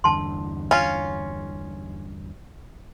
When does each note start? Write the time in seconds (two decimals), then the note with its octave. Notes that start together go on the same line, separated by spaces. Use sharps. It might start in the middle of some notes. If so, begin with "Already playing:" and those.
0.04 E2 G2 D3 A5 C6
0.71 C#4 F4